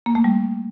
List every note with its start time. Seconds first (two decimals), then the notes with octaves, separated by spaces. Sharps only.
0.06 A#3
0.15 A3
0.24 G3